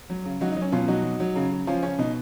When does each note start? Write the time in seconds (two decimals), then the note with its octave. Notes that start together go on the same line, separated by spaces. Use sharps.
0.10 F#3
0.25 C#3
0.41 F#3 D#4 F#4
0.52 D#4
0.57 F#3
0.62 C#4
0.72 B2 C#4 F4
0.88 F#3 D#4 F#4
1.04 F#3
1.20 F#3
1.36 C#3
1.51 C#3
1.67 F3 C#4 F4
1.83 C#3 C#4
1.99 B2 D#4